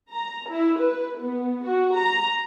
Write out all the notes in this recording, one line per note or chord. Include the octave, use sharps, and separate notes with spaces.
A#5
E4
B4
B3
F#4
A#5